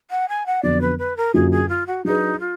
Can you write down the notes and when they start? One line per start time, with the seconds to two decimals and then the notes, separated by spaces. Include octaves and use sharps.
0.10 F#5
0.28 G#5
0.46 F#5
0.63 F2 D3 F#3 B3 D5
0.81 B4
0.98 B4
1.17 A#4
1.34 F#2 D3 F#3 A#3 F4 G#4
1.51 G#4
1.69 F4
1.87 F#4
2.05 F#3 D4 D#4 G#4 B4
2.40 F4